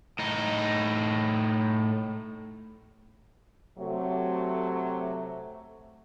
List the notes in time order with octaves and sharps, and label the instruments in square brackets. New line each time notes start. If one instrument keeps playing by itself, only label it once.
[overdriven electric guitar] A2 D#4
[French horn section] C3 F#3 A3